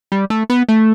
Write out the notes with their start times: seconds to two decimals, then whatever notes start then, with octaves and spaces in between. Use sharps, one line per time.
0.12 G3
0.30 A3
0.50 B3
0.69 A3